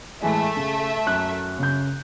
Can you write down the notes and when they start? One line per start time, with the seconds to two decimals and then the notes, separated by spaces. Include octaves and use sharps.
0.22 A2 E3 G#3 A3 E5
0.57 C#3
1.07 F#2 F#6
1.59 C#3 G6